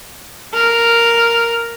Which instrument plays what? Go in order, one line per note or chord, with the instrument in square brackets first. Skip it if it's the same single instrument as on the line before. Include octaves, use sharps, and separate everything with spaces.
[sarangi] A#4